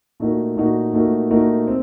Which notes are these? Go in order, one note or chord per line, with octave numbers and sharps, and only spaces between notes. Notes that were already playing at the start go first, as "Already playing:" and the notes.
A#2 A3 D#4 F#4 A#4
A#2 A3 D#4 F#4 A#4
A#2 A3 D#4 F#4 A#4
A#2 A3 D#4 F#4 A#4
C4